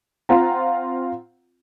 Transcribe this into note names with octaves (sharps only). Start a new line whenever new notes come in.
C4 F4 F#5 A#5